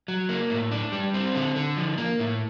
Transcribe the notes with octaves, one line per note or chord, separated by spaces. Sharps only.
F#3
A#3
A2
D4
G3
C4
D3
D3
F3
A#3
A2